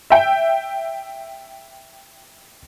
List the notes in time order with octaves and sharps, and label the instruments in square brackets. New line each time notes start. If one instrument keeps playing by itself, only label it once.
[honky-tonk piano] E5 G5